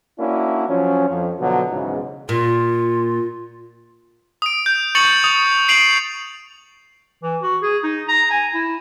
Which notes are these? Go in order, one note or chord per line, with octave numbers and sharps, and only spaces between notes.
A#3 C#4 D4 E4 F#4
F3 F#3 C#4
F2
B2 D3 F3 F#3
B1 E2 G#2 C#3
A#2 F4
D#6 D7
G6
C#6 A6 C#7 F7 F#7
D#6
C7 D7 F7 F#7
E3
F#4
G#4
D#4
A#5
G#5
E4